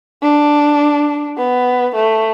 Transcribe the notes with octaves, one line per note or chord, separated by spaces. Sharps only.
D4
B3
A3